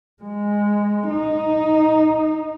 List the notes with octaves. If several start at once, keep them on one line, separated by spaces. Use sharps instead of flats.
G#3
D#4